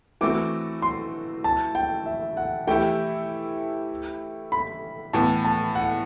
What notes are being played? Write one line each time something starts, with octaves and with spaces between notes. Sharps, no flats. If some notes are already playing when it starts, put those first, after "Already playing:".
E3 A3 C4 F#4 D6
C6
A5
G5
E5
F#5
E3 A3 E4 G4 G5
B5
A2 E3 B3 A5
A5
F#5